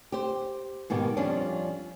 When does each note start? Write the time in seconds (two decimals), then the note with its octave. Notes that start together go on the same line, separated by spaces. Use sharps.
0.12 G4 C5
0.90 G#2 B2 D#3 G4
1.17 F2 F3 G3 C#4 D4